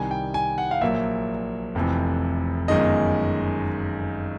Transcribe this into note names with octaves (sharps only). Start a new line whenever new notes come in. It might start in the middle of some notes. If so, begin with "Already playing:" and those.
Already playing: C2 C3 D#3 G3 G#5
G5
G#5
F#5
F5
A#1 A#2 F#3 A#3 E5
F1 F2 C3 E3
G1 F#2 D#3 G#3 D#5